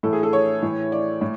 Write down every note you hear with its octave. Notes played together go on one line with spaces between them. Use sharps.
A2 E3 A4
G#4
A4
C#5
A2 E3
D5
A2